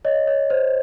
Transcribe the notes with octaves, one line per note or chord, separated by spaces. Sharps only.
C#5 D#5
C#5
C5